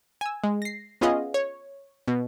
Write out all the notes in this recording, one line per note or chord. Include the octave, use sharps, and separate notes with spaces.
G#5 E6
G#3
A#6 C7
B3 C#4 F4 G#4 D#5 F5
C#5
B2